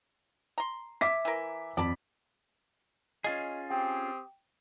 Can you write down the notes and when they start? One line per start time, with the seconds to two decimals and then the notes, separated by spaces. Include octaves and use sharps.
0.58 A#5 C6
1.01 E5 D6 B6
1.25 E3 A#4
1.77 F2 D5 A5 B5
3.24 C#4 F4 G#4 D#5
3.70 C4 G4 G5 D#6